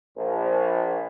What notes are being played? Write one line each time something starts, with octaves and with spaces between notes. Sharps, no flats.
A#1